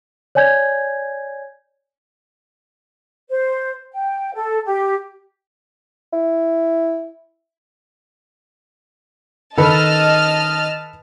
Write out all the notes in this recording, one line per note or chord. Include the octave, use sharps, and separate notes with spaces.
C#5 D5 G#5 G6 G#6
C5
G5
A4
G4
E4
D#3 A4 B4 D#5 A5 F6